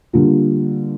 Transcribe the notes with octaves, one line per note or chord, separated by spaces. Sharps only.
D3 G3 A#3 F4